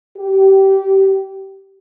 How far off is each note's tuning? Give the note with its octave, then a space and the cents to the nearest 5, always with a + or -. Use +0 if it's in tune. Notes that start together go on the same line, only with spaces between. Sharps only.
G4 -20